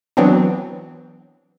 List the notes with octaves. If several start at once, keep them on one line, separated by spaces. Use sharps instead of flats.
E3 F#3 B3 C4 D4